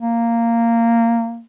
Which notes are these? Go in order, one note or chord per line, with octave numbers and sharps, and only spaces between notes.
A#3